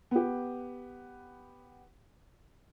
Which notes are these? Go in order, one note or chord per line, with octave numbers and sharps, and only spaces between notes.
B3 G4